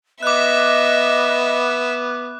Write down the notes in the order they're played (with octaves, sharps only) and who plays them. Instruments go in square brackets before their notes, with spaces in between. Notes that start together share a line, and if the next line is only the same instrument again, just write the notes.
[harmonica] B3 [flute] D#5 [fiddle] E5 [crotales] D6 F#6